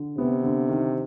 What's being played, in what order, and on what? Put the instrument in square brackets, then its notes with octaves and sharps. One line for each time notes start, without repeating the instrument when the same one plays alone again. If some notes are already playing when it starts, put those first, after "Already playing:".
Already playing: [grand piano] D3
[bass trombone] C3 [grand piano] B3
[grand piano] D3
D#3